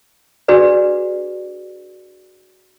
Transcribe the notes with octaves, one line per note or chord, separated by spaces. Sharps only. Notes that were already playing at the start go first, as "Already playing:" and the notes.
D4 F#4 G#4 B4 D5